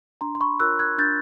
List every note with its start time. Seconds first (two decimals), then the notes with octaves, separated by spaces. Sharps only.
0.21 D4 A#5 C6
0.35 C6
0.41 B5 C#6
0.60 F4 A#4 C#5 E6 F#6
0.79 F#6 G#6
0.98 D4 G6 A6